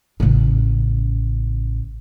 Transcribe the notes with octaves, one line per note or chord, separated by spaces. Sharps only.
A1 C#3